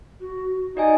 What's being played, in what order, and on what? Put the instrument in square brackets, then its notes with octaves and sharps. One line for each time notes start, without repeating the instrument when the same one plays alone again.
[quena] F#4
[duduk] D#4 [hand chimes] F#4 D#5 G#5 [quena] D5